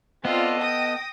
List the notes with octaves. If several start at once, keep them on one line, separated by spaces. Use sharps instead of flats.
B3 C4 F4 A4 D5 D#5
G5 D#6 A#6